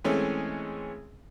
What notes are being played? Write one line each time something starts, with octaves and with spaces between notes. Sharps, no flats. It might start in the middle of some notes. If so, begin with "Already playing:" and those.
E3 G#3 A3 C4 C#4